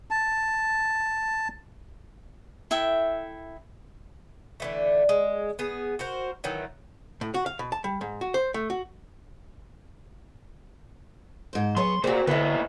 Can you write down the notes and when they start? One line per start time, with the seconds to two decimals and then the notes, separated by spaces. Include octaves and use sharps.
0.10 A5
2.71 E4 A4 E5 G5
4.60 D3 E3 A3
5.09 G#3
5.59 B3 G#4
5.99 F#4 A#4 C5
6.44 D#3 E3 F#3
7.21 A2
7.34 F#4
7.46 F5
7.59 B2
7.72 A5
7.84 G3
8.01 G#2
8.21 F#4
8.34 C5
8.54 A3
8.70 F#4
11.53 G#2 C5
11.77 F#3 B3 G#4 C#5 C6
12.04 A#2 A3 C4 F#4 G#4
12.27 A#2 D3 B3 D#4 E4